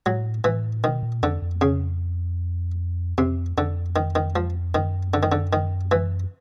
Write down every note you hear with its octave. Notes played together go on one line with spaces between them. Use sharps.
A2 F#3
A2 E3
B2 D#3
A#2
F2 D3
F2
C#3
F2 C3
F2 D3
D#3
D#3
F3
F#2 D#3
D3
D#3
D3
D#3
E3